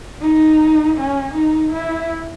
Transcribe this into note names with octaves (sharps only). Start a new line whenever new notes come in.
D#4
C#4
D#4
E4